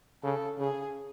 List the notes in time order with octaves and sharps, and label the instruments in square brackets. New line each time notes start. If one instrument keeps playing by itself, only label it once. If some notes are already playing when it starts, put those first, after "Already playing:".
[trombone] C#3 [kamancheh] A4
[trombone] C#3 [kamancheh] G#4